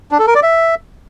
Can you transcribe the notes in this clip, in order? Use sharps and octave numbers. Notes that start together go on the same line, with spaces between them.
D4
A4
A#4
D5
E5